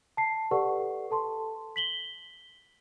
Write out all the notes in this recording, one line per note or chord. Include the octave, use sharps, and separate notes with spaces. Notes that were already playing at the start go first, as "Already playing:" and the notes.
A5 C7
G4 A4 B4 D5 F#5 C#6
A4 A5 C6
B6 F#7 G7